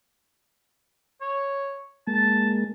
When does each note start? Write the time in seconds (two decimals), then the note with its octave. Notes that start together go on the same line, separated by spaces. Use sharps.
1.21 C#5
2.07 G#3 A#3 A5